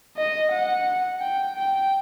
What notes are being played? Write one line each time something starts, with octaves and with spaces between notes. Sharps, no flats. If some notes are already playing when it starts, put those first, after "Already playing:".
D#5
F#5
G5
G5